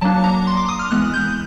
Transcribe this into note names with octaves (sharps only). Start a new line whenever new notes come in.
F#3 A#3 D4 A5
A#5
C6
D6
D#6
F6
E3 G#3 B3 F#6
G6